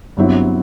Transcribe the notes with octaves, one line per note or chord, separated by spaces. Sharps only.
G1 G2 F#3 C4 E4